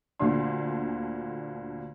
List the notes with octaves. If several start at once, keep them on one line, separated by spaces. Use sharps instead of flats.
D2 A#2 D3 D4 C6